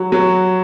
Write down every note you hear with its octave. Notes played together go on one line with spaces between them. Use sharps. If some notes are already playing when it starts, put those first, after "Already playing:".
Already playing: F#3
F#3